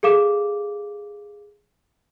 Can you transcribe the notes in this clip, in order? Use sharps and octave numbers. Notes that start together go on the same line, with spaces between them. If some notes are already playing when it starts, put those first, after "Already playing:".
G#4 A4 F5 D6 E7